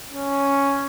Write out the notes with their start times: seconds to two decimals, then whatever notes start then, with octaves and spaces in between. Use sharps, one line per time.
0.12 C#4